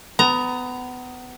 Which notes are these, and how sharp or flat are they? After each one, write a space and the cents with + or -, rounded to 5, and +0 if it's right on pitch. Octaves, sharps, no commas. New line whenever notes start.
B3 +25 A#5 +0